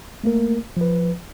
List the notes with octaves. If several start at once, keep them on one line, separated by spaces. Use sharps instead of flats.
A3 A#3 A#4
F3 B4